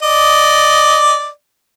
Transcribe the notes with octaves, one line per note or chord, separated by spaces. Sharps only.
D5 D#5